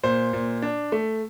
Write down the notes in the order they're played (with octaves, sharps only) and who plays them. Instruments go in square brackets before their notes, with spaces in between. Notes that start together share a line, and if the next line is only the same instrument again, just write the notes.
[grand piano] A#2 C5
A#2
D4
A3